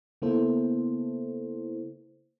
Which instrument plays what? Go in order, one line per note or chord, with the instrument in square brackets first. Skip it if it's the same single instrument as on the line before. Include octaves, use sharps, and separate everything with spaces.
[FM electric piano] C#3 A#3 B3 E4 A4 C5